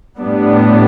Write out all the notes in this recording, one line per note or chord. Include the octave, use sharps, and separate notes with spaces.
A2 G3 B3 D4